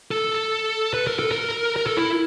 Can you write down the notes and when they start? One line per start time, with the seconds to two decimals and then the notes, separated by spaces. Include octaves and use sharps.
0.11 A4
0.94 B4
1.07 A#4
1.19 A4
1.31 A#4
1.76 A#4
1.87 A4
1.97 E4